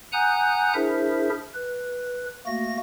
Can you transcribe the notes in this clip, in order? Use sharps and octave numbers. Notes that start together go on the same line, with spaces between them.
F#5 G#5 A#5 D#6 F#6 G6
D4 E4 G#4 A#4 C5 E5
B4
A3 A#3 F#4 A#6